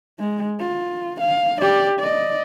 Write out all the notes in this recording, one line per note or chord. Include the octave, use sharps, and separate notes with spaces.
G#3
F4
F5
G4 D5
D5 D#5